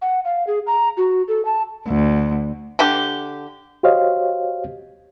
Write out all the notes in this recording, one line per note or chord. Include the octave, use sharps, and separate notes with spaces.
F#5
F5
G#4
A#5
F#4
A4
A5
D2
D3 D4 G4
F#4 G4 C5 C#5 D#5 F5